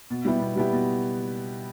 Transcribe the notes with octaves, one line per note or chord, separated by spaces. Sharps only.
B2
G3 B3 E4 G4
B2
G3 B3 E4 G4
B2